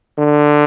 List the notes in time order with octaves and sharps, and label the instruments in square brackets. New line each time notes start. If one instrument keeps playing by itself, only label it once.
[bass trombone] D3